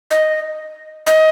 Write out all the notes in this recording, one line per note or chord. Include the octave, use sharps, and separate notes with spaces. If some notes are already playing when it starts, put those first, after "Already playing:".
D#5
D#5